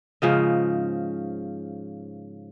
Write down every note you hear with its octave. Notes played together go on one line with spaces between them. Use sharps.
G#2 C#3 F3 D#5